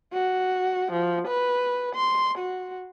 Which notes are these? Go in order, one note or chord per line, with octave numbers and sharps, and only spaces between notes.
F#4
F3
B4
C6
F#4